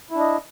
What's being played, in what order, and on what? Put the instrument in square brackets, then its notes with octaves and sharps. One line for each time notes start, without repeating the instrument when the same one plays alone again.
[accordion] E4
D4
D#5